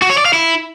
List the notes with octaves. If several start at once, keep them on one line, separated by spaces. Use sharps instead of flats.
F#4
C#5
D5
F5
E4